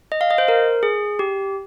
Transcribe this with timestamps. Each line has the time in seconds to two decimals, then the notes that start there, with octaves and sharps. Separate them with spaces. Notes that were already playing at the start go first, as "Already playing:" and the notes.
0.12 D#5
0.21 F5
0.31 D#5
0.38 C5
0.48 A#4
0.83 G#4
1.19 G4